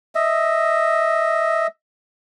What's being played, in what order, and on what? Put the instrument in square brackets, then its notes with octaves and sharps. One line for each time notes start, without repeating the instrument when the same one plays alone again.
[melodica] D#5 E5